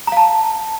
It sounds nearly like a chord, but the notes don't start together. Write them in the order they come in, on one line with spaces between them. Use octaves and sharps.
A#5 F5 A5